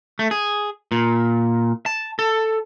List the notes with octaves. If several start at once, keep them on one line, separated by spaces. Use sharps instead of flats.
A3
G#4
A#2
A5
A4